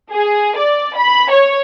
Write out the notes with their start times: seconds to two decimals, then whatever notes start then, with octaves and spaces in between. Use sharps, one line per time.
0.12 G#4
0.56 D5
0.96 B5
1.31 C#5